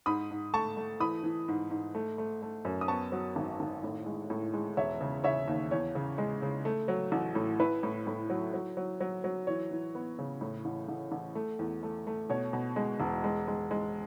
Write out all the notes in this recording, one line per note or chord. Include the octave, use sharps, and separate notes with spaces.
G#2 B5 D#6
G#2
A3 A5 C#6
A3
E3 B5 D#6
E3
G#2
G#2
A3
A3
A3
F#2
D#6
B3 A5 C#6
F#3
G#1
G#1
A2
G#3
A2
G#3
E1 C#5 E5
C#3
C#3 C#5 E5
D#2
E2 C#5
C#3
G#3
C#3
A3
F#3
A1
A2
E4 B4
A2
A2
F#3
F#3
F#3
F#3
F#3
E3 C#5
E3
B3
C#3
A2
A1
A1
A1
A3
E2
A3
A3
B2 C#5
B2
G#3
E1
G#3
G#3
G#3